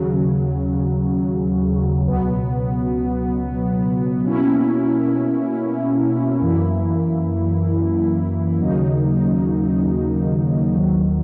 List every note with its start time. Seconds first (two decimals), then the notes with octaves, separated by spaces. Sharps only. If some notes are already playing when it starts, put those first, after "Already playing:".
Already playing: D#2 C#3 F#3
2.07 C#2 B2 F#3 B3
4.24 B2 A#3 C#4 E4
6.42 F#2 E3 A#3 E4
8.59 D#2 C#3 F#3 A#3 D#4
10.75 D#2 D#3 F#3